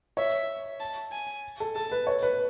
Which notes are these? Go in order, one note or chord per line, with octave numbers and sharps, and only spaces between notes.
C#5 E5
A5
G#5
A4
A4 A5
B4
C#5
B4